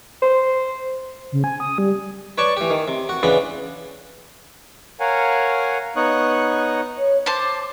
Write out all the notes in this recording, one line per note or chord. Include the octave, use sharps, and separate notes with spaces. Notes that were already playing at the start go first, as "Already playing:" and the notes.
C5
C#3
G#5
D#6
G3
B4 C#5 D5 A5 C#6
E3 G4
D#3
C3
F#4
C#3 E3 B3 D4 B5
A#4 C#5 F5 F#5 G#5
B3 D#4 C#5 C#6 D#6 F#6
C#5
C5 A5 D6